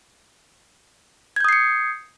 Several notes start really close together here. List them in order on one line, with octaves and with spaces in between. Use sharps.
G#6 G6 D#6 C7 C#7